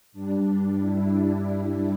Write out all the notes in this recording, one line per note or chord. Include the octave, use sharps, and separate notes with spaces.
G2 G3 D4
E4
D4
D4